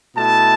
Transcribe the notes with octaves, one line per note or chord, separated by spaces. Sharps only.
B2 A3 E4 A5